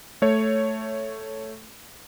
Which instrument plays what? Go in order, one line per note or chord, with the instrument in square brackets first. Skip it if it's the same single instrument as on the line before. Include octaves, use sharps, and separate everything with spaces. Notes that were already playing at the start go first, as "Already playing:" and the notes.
[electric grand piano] A3 C#5